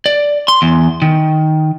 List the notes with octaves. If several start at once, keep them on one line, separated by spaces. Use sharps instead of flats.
D5
C6
E2
D#3